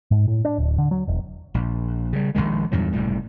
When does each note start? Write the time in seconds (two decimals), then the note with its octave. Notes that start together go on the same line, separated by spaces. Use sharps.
0.11 G#2
0.28 A2
0.45 D4
0.58 D1
0.78 D3
0.91 F#3
1.08 E1
1.54 A#1
2.13 C#3 G3
2.35 A#1 D#2 D#3 G#3
2.72 E2 G2 A#2 F#3
2.93 F#1 A2 C3 G3